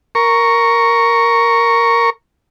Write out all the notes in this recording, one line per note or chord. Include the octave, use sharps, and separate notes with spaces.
A#4 C#6